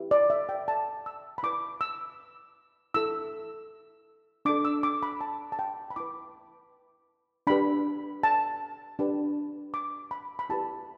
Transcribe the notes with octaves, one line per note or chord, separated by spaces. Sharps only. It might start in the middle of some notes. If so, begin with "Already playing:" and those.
Already playing: E4 G4 B4
D5
E5
G5
A5
E6
B5
E4 B4 D6
E6
E4 A4 E6
D4 A4 D6
E6
D6
B5
A5
A5
G5
B5
E4 B4 D6
D4 G4 B4 B5
A5
D4 G4 B4
D6
B5
B5
E4 G4 B4 A5